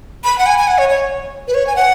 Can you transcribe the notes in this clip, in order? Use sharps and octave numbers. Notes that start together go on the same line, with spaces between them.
B5
F#5
G#5
G#5
F#5
C#5
C#5
B4
C#5
G#5
F#5